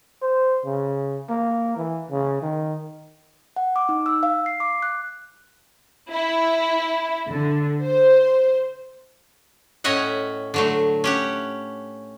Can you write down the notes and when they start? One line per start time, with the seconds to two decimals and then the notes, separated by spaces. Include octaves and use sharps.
0.22 C5
0.65 C#3
1.29 A#3
1.77 E3
2.11 C#3
2.42 D#3
3.56 F#5
3.76 D6
3.89 D#4
4.06 E6
4.23 F5
4.46 C7
4.60 D6
4.82 F#6
6.11 E4
7.29 D3
7.85 C5
9.84 A2 C#4 D#5 E5 F#5
10.54 D3 F#3 A3
11.04 C#4 G4 F#5